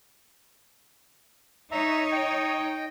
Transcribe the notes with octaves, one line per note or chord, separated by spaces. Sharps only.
D#4 C#5 E5 A#5
D#5 G5